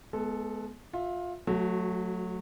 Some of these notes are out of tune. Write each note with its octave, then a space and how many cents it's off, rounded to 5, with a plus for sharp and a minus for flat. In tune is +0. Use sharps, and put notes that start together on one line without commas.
G#3 +35 B3 +0 A4 +0
F4 +20 E5 +0
F#3 -20 A3 +0 F#4 +20